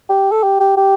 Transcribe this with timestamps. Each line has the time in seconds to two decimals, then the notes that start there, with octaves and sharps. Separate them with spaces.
0.09 G4
0.32 A4
0.43 G4
0.60 G4
0.77 G4